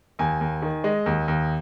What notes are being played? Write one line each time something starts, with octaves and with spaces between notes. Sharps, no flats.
D#2 G#5
D#2
D#3
G#3 D#5
D#2
D#2